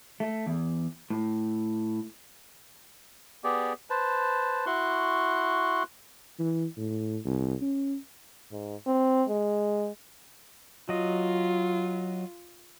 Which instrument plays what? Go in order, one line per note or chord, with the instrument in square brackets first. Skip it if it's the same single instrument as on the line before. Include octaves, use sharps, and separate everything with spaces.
[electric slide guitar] A3
E2
A2
[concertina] B3 G4 G#4 D5
B4 C5 A5
E4 F#4 C6 C#6 F#6
[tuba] E3
A2
C2
C#4
[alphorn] G#2
C4
G#3
[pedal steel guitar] F#3 D#5 [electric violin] F4